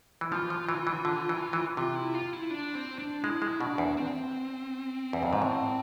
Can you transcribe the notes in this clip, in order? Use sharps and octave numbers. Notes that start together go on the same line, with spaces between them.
E3
F3 F4
F3
E3
E3
D3
E3
E3
C3 F4
E4
F4
E4
D4
C4
D4
G#3 E4
G#3
B2 D4
E2
C4
E2
F2
G#2
A2